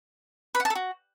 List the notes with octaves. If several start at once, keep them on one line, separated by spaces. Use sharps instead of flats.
B4
F#5
A5
A4
F#4